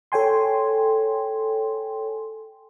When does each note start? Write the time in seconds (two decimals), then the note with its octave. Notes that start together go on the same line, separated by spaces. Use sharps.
0.12 A4 C#5 G5 G#5 C6